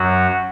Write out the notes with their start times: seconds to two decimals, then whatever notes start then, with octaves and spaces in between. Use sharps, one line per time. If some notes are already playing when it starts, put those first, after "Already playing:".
Already playing: F#2 F#3 F#4